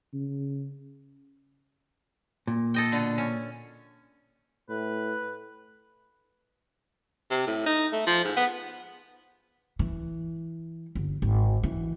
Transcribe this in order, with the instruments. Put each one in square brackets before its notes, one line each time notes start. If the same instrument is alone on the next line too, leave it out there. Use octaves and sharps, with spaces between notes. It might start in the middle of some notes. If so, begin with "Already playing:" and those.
[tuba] C#3
[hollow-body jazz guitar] A#2
[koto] A4 D#5 G5
B2 D3
C#4
[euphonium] A2 [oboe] B4
[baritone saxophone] C3
A2
D#4
A3
F3
G#2
B3
[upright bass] E3
G1
G#1
E3